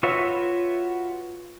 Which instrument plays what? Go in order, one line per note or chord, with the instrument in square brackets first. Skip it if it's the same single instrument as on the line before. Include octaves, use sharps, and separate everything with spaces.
[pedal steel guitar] F4 F#4 B4 C#5 E5